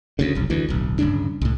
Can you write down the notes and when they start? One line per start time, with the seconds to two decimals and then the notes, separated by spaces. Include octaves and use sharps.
0.19 D2 C#3
0.35 F1 B1
0.50 D2 E3
0.69 D1 B1
0.99 D1 G2 C#3 D4
1.41 C2 A2